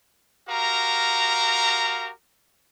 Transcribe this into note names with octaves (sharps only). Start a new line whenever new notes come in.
F#4 G4 A#4 F5 A#5